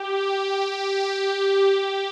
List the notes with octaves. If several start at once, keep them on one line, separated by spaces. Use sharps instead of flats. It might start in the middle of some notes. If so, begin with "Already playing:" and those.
Already playing: G4
G4